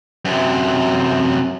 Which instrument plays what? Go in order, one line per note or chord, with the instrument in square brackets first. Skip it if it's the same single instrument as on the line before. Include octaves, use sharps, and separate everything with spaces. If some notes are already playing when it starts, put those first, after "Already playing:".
[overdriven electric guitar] F#2 C3